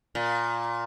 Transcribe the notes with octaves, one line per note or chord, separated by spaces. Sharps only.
A#2